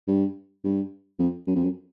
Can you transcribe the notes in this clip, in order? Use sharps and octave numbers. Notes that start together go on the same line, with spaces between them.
G2
G2
F2
F#2
F2
F#2